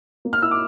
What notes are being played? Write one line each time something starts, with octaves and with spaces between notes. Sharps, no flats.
A#3
F6
E4 E6
D6